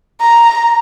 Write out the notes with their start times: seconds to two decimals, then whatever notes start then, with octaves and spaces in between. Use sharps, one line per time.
0.21 A#5